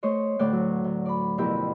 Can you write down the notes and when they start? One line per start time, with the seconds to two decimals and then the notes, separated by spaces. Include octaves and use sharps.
0.03 A3 C5 C#5 D#5
0.39 D2 A2 A3 D5 G5 F#6
0.53 F#3
0.84 D2
1.06 D5 B5
1.38 F2 B2 E4 G4 A#4 B5